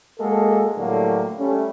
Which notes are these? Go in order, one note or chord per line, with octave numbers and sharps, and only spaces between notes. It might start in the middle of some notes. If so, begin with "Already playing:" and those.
G#3 A#3 F#4 A4
A2 D3 F#3 G3 A#3
G3 A3 C#4